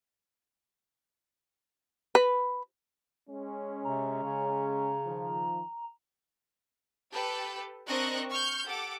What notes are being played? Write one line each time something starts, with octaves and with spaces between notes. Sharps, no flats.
B4
G#3 C#4
C3 A#5
C#3
D#3 F3
G4 A4 B4 G5 A5
C4 D4 A#4 D#5 C#6 F#6
C#6 F6 G6
G4 A4 F#5 D6